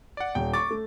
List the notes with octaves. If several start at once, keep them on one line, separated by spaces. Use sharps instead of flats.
D5 F#5
D#1 G5
C#6 D6 A6
A3